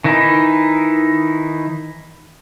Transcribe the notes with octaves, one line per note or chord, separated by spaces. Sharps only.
D#3 E3 D#4 E4